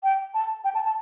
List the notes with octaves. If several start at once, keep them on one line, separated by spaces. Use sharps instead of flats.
G5
A5
G5
A5
A5